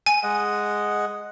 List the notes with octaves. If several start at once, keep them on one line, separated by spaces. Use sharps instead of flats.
G#5
G#3 D#5 F#5